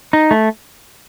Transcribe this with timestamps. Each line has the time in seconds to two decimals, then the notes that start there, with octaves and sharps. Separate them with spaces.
0.13 D#4
0.31 A3